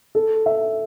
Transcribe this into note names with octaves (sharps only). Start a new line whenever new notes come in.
A4
E5